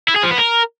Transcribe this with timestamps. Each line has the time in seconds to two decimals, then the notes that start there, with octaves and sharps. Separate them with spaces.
0.09 E4
0.16 G#4
0.23 F3
0.31 B3
0.38 A#4